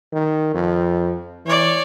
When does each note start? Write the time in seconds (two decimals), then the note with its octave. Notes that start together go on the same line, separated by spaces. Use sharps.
0.12 D#3
0.54 F2
1.46 E3 C#5 D5